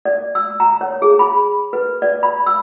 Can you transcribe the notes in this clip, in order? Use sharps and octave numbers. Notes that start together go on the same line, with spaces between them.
D5
E6
A#5
C#5
G#4
B5
B4
D5
B5
E6